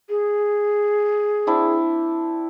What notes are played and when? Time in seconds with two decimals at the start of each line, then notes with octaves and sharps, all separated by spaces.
0.09 G#4
1.47 C4 D4 E4